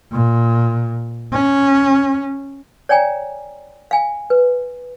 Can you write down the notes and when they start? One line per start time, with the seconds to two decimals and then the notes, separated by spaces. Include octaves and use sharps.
0.12 A#2
1.32 C#4
2.89 C#5 D5 G5 G#5 A#5
3.91 F5 G#5
4.30 B4